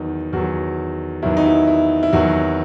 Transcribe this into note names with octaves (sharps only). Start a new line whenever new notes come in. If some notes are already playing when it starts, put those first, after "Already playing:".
Already playing: E2 D#3 F#3 D#4
E2 D#3 F#3 F#4
E2 D#3 F#3 E4
D#4
E4
E4
E4
E2 D#3 F#3 F#4